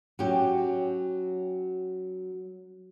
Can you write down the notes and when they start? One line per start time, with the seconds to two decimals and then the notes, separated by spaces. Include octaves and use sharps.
0.19 F#3 C#4 G4